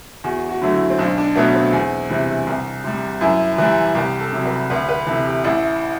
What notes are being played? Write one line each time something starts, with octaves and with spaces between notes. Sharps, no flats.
E2 F#4
F#4
D3 F#3 A3
E4
C4
B1 D4
D4
B2 F#3 A3 B3
C4
E2
C3 E3 G3
C2
C3 G3
F#2 E4
E3 G3
C2 G4
A4
C3 F#3
B4
D2 B4
B4
C3 E3 A4
G4
A1 E4